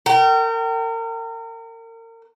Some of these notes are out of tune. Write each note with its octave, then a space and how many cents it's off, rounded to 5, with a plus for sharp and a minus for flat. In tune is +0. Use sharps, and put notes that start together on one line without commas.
A#4 -35 G5 -30